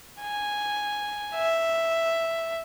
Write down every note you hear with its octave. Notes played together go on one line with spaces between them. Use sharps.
G#5
E5